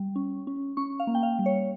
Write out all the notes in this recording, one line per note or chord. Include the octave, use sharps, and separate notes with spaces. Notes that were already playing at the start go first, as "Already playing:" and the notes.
Already playing: G3
C#4
C#4
C#4 C#6
F5
A#3
G5
F5
G3
C#5